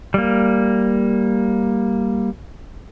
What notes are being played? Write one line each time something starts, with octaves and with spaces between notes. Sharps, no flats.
G3 A#3